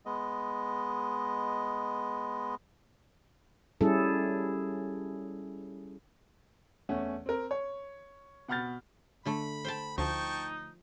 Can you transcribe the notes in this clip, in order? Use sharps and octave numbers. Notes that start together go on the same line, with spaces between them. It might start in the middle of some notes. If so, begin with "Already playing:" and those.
G#3 B3 D#5
G3 C#4 E4 G#4 A4
E2 A3 C#4 F#5
C4 A#4
C#5
B2 F#5 B5 F6 G6 A6
D3 A3 D4 B5
C5 G5 A5
D2 F3 D#4 G5 A5 C#6